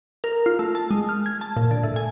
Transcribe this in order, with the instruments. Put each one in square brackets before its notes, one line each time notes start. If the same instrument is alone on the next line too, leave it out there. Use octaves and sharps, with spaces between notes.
[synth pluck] A#4
F4
A3
A5
G#3
F6
G#6
A5
A#2
D3
A2
G#5